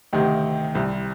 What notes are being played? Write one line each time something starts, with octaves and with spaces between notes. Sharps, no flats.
D2 C3 D#3 D#4 G4
C2 C3 G3